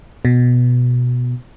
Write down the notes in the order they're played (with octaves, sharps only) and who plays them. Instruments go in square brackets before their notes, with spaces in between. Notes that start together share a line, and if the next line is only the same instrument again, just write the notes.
[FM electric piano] B2